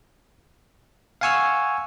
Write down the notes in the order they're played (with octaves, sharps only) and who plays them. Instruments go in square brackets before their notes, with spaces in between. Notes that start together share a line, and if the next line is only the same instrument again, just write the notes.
[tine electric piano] F5 F#5 G#5 C#6 E6 F6